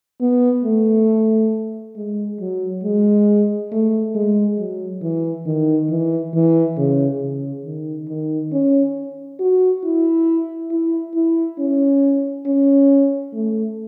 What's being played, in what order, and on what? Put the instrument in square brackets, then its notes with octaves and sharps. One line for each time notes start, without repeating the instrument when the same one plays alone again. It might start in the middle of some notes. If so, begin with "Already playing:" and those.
[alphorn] B3
A3
G#3
F#3
G#3
A3
G#3
F#3
E3
D#3
E3
E3
C#3
C#3
D#3
D#3
C#4
F#4
E4
E4
E4
C#4
C#4
A3